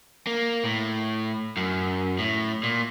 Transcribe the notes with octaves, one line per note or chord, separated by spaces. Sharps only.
A#3
A2
F#2
A2
A#2